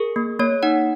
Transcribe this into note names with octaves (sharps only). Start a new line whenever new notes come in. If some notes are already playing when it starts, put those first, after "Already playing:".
Already playing: G#4 A#4
A#3
A#3 C#5
D#4 F#5